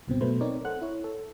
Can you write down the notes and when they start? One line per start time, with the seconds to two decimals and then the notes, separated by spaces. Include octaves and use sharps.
0.07 C#2 G2 B2 C4
0.21 B2 F#3 A3 B4 C5
0.41 C4 D#4 A#4 C#5 D5
0.65 A4 C5 F#5 F#6
0.82 E4 C#5
1.04 A4